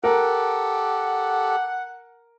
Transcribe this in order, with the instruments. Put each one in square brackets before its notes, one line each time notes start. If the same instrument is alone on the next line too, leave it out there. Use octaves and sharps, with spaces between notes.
[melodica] G4 A4 [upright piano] A#4 [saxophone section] F#5